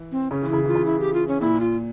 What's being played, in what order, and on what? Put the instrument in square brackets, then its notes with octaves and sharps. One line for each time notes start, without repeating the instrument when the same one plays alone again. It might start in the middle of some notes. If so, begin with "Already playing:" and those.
Already playing: [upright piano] E3
[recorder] C4
[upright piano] C#3 [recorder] C#4
[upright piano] E3
[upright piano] C#3 [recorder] E4
[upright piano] E3 [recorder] E4 F4
[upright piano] C#3
[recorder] E4
G4
F4
C#4
[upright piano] A#2 [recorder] E4
[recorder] F4